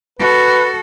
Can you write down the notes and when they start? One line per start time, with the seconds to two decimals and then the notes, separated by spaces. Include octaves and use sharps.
0.19 F#4 A4 B4